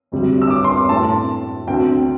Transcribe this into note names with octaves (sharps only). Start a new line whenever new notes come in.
D2 C3 G3 C4
E6
D6
C6
C6
A2 A3 C4 A5
D2 D3 C4 G5